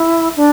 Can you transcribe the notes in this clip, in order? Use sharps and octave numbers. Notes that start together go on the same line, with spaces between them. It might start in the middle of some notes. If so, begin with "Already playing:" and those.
Already playing: E4
D4